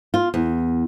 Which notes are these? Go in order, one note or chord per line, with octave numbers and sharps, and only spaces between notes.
F4
E2